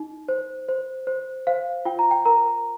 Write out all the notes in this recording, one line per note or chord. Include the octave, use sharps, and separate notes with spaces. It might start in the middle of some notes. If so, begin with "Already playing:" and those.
Already playing: D#4
C5
C5
C5
C5 F5
F4 G5
A#5
G5
A#4 A#5